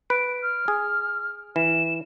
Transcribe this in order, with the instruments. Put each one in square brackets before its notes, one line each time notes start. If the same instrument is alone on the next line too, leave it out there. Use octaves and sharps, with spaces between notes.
[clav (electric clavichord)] B4 [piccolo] D7
[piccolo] F6
[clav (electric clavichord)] G#4
[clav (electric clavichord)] E3 [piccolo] E7